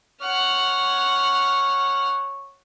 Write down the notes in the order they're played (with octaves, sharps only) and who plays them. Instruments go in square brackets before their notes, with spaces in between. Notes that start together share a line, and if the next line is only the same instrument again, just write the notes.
[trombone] C#5 [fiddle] F#5 F6